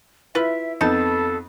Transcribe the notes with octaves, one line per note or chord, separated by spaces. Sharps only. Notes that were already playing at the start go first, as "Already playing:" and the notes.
E4 F4 B4 E5
F2 B3 D#4 A4 A5